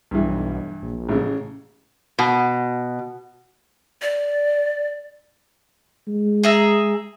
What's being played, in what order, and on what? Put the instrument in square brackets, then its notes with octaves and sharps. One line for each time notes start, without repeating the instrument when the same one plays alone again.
[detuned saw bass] B1 [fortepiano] G2 E3
[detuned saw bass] A#1
[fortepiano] A1 C#3
[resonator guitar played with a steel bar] B2
[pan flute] D5
[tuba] G#3
[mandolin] G#4 E5 A#5